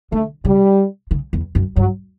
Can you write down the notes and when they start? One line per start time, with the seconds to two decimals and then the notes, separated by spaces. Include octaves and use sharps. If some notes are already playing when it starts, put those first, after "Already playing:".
0.12 D3 A3
0.45 C#3 G3
1.11 C#3
1.33 E2
1.55 F#2
1.76 G2 F#3